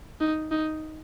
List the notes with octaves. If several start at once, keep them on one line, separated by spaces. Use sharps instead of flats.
D#4
D#4